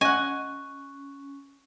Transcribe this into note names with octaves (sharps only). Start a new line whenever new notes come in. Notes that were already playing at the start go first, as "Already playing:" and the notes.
C#4 D#5 F#5 G#5 C#6 F#6